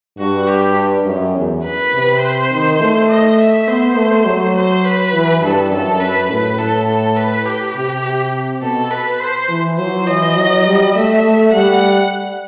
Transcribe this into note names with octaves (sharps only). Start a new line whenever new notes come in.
G2 F#4
G4
F#2
E2
B4
C3
C5
D#3
A3
D#5
E5
B3 C5
A3
F#3
C5
B4
E3
G2 A4
F#2 A4
F#2 B4
A2 B4
A2 A4
A4
B4
G4
C3
B2 A4
B4
C5
E3
F#3 C5
E3 D#5
F#3
G3
A3 E5
A3
G3 F#5